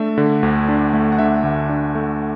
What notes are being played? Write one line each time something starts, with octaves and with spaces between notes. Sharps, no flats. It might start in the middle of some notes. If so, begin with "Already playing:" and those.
Already playing: A3 D4 E5
D3
D2
D4
A3
F#5
D3 E5
D2
D4
A3